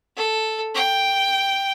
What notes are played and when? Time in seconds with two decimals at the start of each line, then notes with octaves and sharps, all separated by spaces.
0.17 A4
0.74 G5